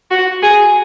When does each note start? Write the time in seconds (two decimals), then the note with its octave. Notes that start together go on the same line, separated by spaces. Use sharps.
0.11 F#4
0.42 G#4